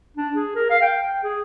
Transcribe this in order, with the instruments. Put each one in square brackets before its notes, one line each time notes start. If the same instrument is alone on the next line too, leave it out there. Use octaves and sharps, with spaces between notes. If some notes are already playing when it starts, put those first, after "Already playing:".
[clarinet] D4
G#4
A#4
F5
G5
G5
G#4